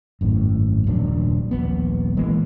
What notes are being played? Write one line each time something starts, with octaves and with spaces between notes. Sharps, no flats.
G#1 F#2 A2
D#1 A#1 F#3 D4
D#1 A#1 A#2 B3
E3 G#3 A#3